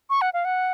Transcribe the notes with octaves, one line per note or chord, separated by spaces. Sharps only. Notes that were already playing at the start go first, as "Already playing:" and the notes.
C#6
F#5
F5
F#5